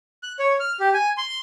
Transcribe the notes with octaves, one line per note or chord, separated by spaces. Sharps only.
F#6
C#5
F6
G4
G#5
C6